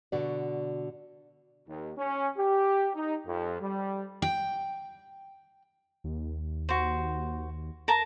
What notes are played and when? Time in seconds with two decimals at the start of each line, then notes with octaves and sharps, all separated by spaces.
0.12 B2 D3 F#4 D5
1.68 D#2
1.97 C#4
2.37 G4
2.95 D#4
3.26 F2
3.61 G3
4.22 G5
6.04 D#2
6.69 F#4 C5
7.88 A#4 A5 A#5